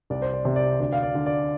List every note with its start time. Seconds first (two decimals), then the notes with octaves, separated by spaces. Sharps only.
0.10 C2 D5
0.22 C5
0.33 D5
0.45 C3
0.56 D5
0.80 D2 D5
0.93 F5
1.03 D5
1.15 D3
1.26 D5